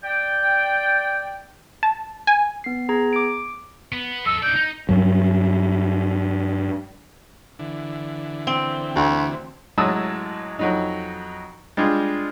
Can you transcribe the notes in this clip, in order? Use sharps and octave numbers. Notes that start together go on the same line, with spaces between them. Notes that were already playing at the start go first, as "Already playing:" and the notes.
D5 G5
A5
G#5
B3 C7
B3 G#4 A#5 G#6
D6 D7
B3
A4 D#5 E6
D#4 D5 G6
D#4
G2 F#3
D3 E3
C4
D2
A1 F#3 G#3 A5 D#6 E6
F2 F#3 D#4
G3 G#3 D4 F4 G#4